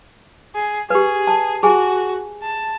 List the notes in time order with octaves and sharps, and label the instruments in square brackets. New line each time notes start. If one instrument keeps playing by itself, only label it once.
[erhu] G#4
[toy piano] G4 B4 [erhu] G#4
[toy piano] A5
[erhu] F#4 [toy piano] G#4 G#5
[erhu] A5